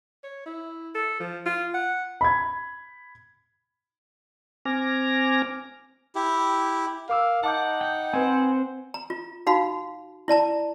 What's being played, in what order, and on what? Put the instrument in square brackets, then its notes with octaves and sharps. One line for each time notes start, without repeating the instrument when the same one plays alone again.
[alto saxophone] C#5
E4
A4
F3
F4
F#5
[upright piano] B5 G#6
[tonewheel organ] C4 G#5 D6 F6 A#6
[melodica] E4 G4
[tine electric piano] A#4 D6 E6 [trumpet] F5
[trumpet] D#4 [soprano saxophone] F#5 [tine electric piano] A5 D6 G6
[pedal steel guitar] G5
[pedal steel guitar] C4 C5 [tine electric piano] B4 G#5
[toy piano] A#5
F4
D#4 F#4 F5 B5
E4 D5 A5 A#5